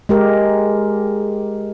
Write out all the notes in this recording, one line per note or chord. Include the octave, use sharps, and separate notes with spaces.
G#3 G4 A#4